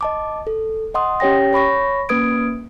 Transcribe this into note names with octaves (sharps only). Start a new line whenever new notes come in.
D#5 A5 D6
A4
D#5 F#5 C6 D#6
C#4 G4 C#5 G5 A#6
C#5 B5 C#6 A#6
A#3 C#4 B4 D#6 G#6 D7